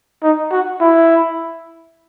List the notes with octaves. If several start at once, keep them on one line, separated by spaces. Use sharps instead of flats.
D#4
F#4
E4